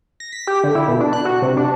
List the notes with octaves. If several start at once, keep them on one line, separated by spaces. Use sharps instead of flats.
A#6
B6
G4
D3
E4
B2
D4
F#6
F#4
C3
D4